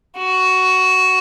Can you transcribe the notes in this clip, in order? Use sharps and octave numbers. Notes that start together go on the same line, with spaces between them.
F#4